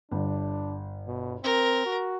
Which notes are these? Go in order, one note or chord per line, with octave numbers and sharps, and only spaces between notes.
G1 D4
B2
C4 A#4
F#4